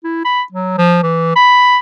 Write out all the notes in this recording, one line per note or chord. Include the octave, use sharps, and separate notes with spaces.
E4
B5
F#3
F3
E3
B5